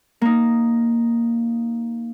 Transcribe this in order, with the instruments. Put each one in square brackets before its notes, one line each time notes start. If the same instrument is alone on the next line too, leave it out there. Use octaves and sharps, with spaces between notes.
[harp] A#3 D#4